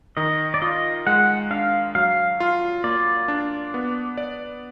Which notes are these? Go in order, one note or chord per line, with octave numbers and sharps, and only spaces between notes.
D#3 D#5
D5
F4 D#5
G#3 F#5
D4 F5
F#3 F5
F4
A#3 D5
D4
B3
D5